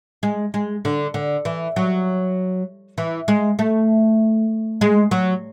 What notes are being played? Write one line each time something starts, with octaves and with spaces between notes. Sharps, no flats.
G#3
G#3
D3
D3
E3
F#3
E3
G#3
A3
G#3
F#3